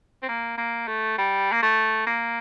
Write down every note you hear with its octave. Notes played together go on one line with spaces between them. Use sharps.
C4
A#3
A#3
A3
G3
A#3
A3
A#3